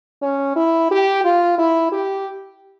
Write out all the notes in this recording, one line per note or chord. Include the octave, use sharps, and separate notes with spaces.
C#4
E4
G4
F4
E4
G4